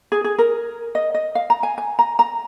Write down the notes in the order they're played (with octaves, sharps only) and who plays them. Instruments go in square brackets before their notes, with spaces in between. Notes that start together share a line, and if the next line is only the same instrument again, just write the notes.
[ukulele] G#4
G#4
A#4
D#5
D#5
F5
A#5
G#5
G#5
A#5
A#5